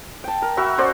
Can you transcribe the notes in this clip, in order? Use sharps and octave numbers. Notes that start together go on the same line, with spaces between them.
G5 A5
A#4
F#4 A#4 E5 B5
C#4 C5 D5 F#5